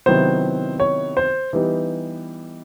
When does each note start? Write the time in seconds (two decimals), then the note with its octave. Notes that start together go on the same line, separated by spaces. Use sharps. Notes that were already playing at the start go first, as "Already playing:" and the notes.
0.06 C3 D#3 F#3 B3 E4 C5
0.80 C#5
1.17 C5
1.53 E3 G3 B3 D#4